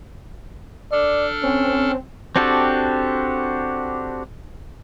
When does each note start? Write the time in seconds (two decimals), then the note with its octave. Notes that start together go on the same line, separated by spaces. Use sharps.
0.92 D4 A4 D5 F6
1.43 C4 C#4
2.36 C4 D4 F#4 G4 A4